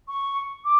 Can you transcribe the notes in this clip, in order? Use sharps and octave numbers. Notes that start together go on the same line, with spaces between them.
C#6
D6